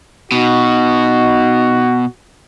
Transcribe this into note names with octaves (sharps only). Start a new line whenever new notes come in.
B2 D#4 F#4